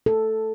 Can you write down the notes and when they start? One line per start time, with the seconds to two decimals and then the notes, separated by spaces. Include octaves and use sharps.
0.06 A4